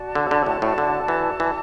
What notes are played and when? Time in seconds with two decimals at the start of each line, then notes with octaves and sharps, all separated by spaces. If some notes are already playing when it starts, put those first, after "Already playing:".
Already playing: F#4 D5 A5
0.15 D3
0.31 D3
0.46 A2
0.62 A2
0.78 D3
1.08 E3
1.40 E3